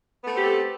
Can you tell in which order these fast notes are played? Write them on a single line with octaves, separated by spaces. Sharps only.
B3 A3 C4 G4 A4